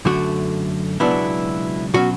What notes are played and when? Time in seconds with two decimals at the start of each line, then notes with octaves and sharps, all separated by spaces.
0.05 F#2 D3 A3 F#4
1.00 C#2 B2 F#3 B3 D4 E4
1.94 B2 F#3 C#4 F#4